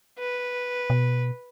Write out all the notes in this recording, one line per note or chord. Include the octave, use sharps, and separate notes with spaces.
B4
B2